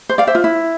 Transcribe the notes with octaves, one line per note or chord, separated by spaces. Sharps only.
C5
D5 F5
C5 E5
F4
E4